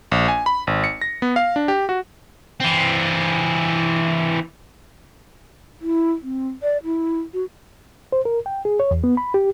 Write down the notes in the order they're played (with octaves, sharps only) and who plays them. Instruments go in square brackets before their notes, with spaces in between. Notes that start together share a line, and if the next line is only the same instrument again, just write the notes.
[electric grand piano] A#1
G#5
B5
G#1
C#7
A#6
B3
F5
D4
G4
F#4
[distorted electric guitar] E3 C4
[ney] E4
C4
D5
E4
F#4
[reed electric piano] C5
A#4
G5
G#4
C#5
E2
B3
B5
G4